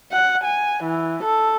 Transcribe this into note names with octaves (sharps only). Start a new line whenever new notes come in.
F#5
G#5
E3
A4